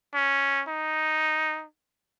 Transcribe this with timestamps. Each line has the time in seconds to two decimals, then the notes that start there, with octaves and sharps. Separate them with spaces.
0.14 C#4
0.68 D#4